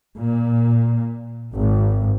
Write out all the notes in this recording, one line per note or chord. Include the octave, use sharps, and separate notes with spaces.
A#2
G#1